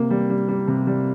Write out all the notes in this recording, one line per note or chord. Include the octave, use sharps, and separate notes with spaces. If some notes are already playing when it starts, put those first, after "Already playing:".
Already playing: C3 A#3
G3
G3
G3
C3
G3